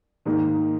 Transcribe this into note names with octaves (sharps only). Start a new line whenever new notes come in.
G#2 D#3 A#3 D#4